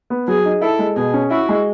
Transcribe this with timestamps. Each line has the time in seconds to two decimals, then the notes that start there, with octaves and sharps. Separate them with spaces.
0.10 B3
0.28 F#3 G#4
0.45 D#4
0.62 E4 A4
0.79 G#3
0.96 B2 G#4
1.14 C#4
1.31 E4 F#4
1.49 G#3